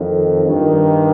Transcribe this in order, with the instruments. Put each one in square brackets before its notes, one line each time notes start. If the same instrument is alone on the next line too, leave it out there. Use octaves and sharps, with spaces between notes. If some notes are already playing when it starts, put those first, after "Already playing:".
Already playing: [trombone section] F2 D#3
G2 D#3